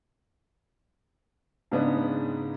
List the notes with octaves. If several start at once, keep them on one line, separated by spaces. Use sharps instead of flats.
G#2 C#3 G#3 B3 D4 D#4